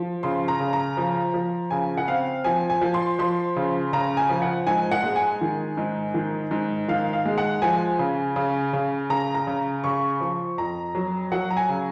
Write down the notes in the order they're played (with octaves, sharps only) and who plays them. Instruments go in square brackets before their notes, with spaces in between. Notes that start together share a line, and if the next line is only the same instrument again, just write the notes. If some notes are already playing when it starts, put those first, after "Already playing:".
Already playing: [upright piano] F3
C#3 C6
A#5
C#3
A#5
F3
F3
C#3 G#5
F#5
C4 F5
F3 G#5
G#5
F3
C6
F3 C6
C#3
C#3 A#5
G#5
F3
F#5
G#2 G#5
F#5
G#3
G#5
D#3
G#2
D#3
G#2
D#3 F5
F5
G#3
F#5
F3 G#5
C#3
C#3
C#3
C#3 A#5
A#5
C#3
C#3 C#6
F3
F2 A#5
F#3
F#3 F#5
A#5
G#5
C#3